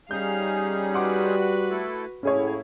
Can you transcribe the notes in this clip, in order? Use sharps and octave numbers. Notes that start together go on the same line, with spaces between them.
G3 C#4 D#4 G#4 F5 G6
F#4 B4 F#5 C6 D6
A3 E4 A4
A2 A#3 C#4 E4 G#4 C#5